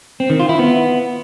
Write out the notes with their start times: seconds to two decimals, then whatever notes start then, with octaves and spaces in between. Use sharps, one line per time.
0.20 C4
0.30 D#3
0.39 F4
0.49 E4
0.59 B3